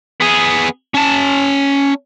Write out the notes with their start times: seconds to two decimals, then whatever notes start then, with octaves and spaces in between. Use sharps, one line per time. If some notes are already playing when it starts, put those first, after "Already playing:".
0.20 B3 G#4
0.94 C#4 A5